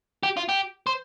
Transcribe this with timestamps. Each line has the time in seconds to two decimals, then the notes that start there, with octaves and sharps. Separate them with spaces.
0.23 G4
0.37 F4
0.49 G4
0.87 C5